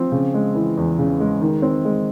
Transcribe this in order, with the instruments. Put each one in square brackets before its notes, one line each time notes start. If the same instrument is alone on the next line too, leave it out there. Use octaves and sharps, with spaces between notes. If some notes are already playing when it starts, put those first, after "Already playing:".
Already playing: [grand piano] F3 C4
C#3
G#3
E3
E2
C#3
G#3
D#3
C4
G#3